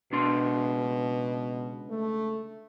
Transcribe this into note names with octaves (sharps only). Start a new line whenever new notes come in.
C#2 B2 D4 C6
A3